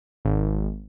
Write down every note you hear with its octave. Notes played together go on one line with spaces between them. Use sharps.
G#1